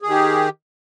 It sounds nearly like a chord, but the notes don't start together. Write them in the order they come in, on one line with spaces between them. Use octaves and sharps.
G#4 D#3 G4